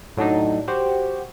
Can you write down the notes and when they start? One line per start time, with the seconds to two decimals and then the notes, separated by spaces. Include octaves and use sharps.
0.17 A2 F#3 D4 D#4
0.68 F#4 G4 C5